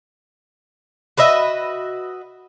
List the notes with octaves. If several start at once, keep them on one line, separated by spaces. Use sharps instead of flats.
F#4 B4 D#5 E5